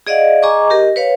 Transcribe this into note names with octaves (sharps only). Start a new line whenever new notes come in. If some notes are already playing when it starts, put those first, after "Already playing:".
G#4 D5 D#5 F5 F#5
G#4 D#5 G#5 A#5 C#6 D6
G4 A#4 D#5
B4 C#5 F5